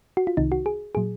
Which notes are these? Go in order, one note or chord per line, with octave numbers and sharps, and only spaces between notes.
F#4
F4
C2 C3 D#3 D#4
F#4
G#4
A#2 F#3 G#4